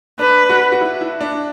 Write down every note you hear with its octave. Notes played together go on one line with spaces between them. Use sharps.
D4 B4
F#4
F#4
E4
E4
D4